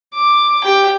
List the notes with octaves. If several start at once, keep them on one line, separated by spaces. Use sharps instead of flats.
D6
G4 G5